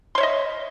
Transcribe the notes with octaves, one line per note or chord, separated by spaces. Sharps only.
C#5 D#5 E5 C6